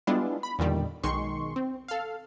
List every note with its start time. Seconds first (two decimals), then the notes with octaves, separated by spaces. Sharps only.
0.07 G3 G#3 B3 D4 E4 F4
0.43 B5
0.59 E2 A#2 D3 D#3 G3
1.03 B1 D#3 G#3 C6 C#6
1.56 C4
1.88 A4 F5